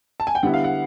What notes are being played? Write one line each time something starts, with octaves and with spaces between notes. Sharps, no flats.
A5
G#5
G5
D3 G3 B3 E4 F#5
F5
F#5